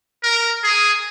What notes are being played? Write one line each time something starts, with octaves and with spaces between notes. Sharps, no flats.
A#4
G#4